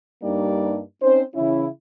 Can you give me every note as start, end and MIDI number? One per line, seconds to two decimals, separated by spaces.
0.22 0.80 43
0.22 0.80 55
0.22 0.80 58
0.22 0.80 62
0.22 0.80 63
0.22 0.80 74
1.02 1.22 60
1.02 1.22 61
1.02 1.22 63
1.02 1.22 72
1.35 1.65 49
1.35 1.65 52
1.35 1.65 61
1.35 1.65 64